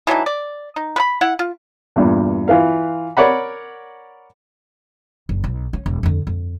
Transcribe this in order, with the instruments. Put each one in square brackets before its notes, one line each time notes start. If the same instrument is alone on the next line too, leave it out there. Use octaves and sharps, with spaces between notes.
[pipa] E3 F#3 D4 D#4
D5
D#4
B4 B5
E4 F#5
F4
[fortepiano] E2 G2 A#2
E3 F4 B4 F5
A#4 C#5 D5 F#5 B5
[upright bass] F#1
B1
C#4
E1
F2 D3
F2